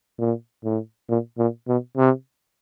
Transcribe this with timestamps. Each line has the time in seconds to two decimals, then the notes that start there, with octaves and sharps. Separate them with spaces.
0.19 A#2
0.64 A2
1.09 A#2
1.38 A#2
1.68 B2
1.97 C3